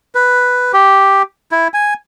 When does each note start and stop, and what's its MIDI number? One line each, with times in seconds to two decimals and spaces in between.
0.15 0.72 71
0.73 1.22 67
1.51 1.68 64
1.74 1.94 80